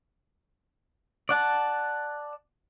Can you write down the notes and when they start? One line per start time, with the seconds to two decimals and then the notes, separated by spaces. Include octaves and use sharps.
1.29 D5 F#5 A5